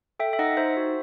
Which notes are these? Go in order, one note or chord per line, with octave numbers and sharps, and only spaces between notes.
A4 E5 G5
E5
D#4 D#5 F#5
D#4 C5 E5
F#4